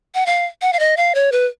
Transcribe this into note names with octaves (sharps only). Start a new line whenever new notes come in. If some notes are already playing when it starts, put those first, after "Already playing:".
F#5
F5
F#5
F5
D#5
F5
C#5
B4